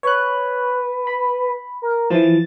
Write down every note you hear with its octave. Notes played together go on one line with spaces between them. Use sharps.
B4 C#5 F#6
B5
A#4
E3 F3 A6